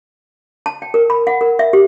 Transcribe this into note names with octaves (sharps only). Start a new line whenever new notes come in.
A5
G5
A#4
B5
F#5
A#4
E5
G4